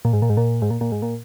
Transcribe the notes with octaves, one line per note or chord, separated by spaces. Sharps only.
A#2
G#2
A#2
G#2
A#2
G#2
A#2
A#2
G#2
A#2